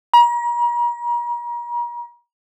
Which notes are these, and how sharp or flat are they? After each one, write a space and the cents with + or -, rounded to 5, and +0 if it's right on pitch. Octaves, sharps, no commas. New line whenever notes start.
A#5 +40